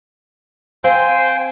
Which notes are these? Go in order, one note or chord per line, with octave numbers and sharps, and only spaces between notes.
C4 C5 F5 G5 G#5 C6